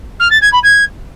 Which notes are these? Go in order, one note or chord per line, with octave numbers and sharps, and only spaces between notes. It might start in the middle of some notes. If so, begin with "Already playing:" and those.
F6
A6
G#6
B5
G#6